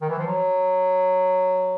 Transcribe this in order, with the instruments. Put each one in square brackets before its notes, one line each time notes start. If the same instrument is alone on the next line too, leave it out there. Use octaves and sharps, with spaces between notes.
[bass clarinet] D#3
E3
F3
F#3